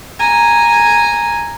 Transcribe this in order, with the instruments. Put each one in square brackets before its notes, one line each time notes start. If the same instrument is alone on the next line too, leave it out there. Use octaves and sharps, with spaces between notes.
[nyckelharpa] G#5 A#5